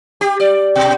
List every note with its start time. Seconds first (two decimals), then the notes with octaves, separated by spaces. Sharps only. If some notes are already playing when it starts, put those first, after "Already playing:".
0.21 G4
0.40 D5
0.75 B2